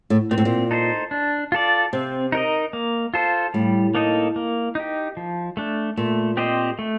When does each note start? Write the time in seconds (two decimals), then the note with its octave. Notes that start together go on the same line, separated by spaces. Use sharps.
0.10 A2
0.31 A#2 C4
0.38 A2
0.45 A#2
0.71 D#4 A4 C5
1.11 D4
1.52 F4 A4 D5
1.93 C3 C4
2.32 D#4 A#4 D#5
2.73 A#3
3.14 F4 A4 C5
3.54 A2 G3
3.95 A#3 D#4 A4 D#5
4.36 A#3
4.75 D#4 G4
5.17 F3
5.57 A3 D4
5.97 A#2 A3
6.37 C4 G4 C5 D#5
6.79 A3